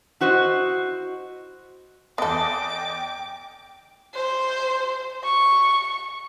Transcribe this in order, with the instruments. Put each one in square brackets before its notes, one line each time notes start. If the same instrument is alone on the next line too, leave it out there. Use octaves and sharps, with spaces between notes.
[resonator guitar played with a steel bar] E4 F#4 C5 D#5
[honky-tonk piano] E2 D#5 [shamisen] B3 A4 [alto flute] G5 [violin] D6
[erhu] C5
C#6